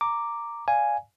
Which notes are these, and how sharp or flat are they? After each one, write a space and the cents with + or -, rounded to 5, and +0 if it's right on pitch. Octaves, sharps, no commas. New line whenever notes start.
A#5 -10 D6 +0
D5 +5 F5 +0 G#5 +0